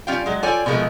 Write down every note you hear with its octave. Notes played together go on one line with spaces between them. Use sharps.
G3 C#4 F4 F5 G5
F#3 G#3
F4 A4 C#5 D5 G5 G#5
B2 E3 F3 G#3 A3 A#4